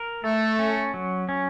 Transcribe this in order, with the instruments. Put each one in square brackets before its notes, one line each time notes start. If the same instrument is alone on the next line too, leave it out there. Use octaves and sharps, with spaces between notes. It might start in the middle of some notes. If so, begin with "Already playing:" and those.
Already playing: [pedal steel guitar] A#4
[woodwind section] A3 [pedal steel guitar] A4
[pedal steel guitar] C#4
F#3
C#4